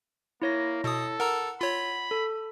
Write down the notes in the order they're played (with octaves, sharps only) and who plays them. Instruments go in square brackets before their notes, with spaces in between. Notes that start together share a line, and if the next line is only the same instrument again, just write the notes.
[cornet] A#3 [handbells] E4 C#5 A#6
[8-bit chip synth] B2 D#6 [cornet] A4
[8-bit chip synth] A#4 A#5 E6 [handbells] F#5
[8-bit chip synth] F4 C#5 [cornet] B5
[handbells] A4